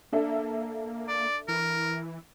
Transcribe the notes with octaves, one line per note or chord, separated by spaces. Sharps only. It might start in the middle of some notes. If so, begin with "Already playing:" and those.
A#3 D4 A4 E5
D5
E3 A#4